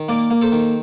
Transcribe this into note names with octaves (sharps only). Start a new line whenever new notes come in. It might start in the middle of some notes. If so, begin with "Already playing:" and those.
Already playing: D#3
A#3 A#4 D5
A#3
A4 C5
D#3